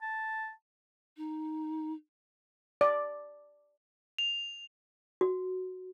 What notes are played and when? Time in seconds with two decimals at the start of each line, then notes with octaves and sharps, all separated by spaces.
0.02 A5
1.17 D#4
2.81 D5
4.18 F7
5.21 F#4